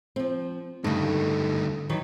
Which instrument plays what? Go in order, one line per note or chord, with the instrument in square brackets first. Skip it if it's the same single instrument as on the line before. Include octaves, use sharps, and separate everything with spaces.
[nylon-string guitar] F3 C4
[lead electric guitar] D2 D#4 [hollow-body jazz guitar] G2 C#3 [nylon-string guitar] A3
[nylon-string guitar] D#3 E3 F#3